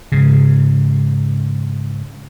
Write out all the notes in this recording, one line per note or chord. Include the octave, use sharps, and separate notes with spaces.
G#2 C#3